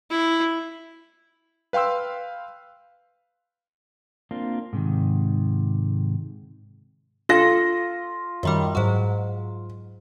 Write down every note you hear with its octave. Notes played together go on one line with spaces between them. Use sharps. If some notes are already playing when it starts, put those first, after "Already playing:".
E4
B4 F5 G5 C6 E6
A#3 C4 D4 F4
G#2 C3 D#3
F4 A4 A#6
F#2 D#3 G3
G#2 F#3